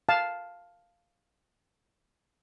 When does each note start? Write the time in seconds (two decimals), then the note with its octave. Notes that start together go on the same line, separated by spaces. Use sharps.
0.09 F5 A5